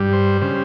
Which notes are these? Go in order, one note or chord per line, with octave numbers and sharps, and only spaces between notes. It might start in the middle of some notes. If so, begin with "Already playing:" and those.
Already playing: G2 G3
C5
C#3 G3 C5